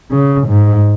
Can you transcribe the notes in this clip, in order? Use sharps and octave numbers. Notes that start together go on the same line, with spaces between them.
C#3
G#2